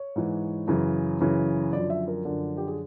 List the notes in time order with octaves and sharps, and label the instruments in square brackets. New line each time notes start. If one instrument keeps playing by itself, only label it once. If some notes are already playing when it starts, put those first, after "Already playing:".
Already playing: [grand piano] C#5
G#2 E3
F#2 C#3 E3
F#2 C#3 E3
F#2 D3 F3 D5
E5
A#4
F#2 D3 F3
G4
G#4